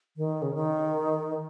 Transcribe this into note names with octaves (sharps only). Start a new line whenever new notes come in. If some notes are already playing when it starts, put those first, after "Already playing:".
D#3
C#3
D#3